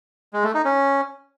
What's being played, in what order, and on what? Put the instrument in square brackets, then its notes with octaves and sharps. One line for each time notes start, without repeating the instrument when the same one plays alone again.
[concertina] G#3
A3
D#4
C#4